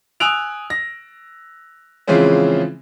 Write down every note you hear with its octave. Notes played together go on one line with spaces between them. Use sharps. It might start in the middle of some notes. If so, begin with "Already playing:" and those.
G#5 D#6 E6 F#6 D7 F7
A#6
C#3 E3 F3 G#3 C4 C#4